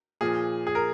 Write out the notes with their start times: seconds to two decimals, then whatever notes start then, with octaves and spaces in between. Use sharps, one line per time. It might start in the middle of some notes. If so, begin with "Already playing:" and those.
0.21 A#2 F3 G#4
0.67 G#4
0.75 A#4